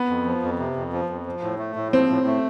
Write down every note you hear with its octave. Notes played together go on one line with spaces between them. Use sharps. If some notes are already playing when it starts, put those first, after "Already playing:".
Already playing: B3
F2
F3
F2
C3
F2
F3
F2
F3
A2
A3
A2
F3 C4
A2
A3